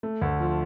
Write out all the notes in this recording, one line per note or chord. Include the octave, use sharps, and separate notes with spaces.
A3
D2
F3